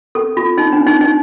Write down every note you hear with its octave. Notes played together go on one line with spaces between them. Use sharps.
A4
F4
D#4
D4
D#4
D#4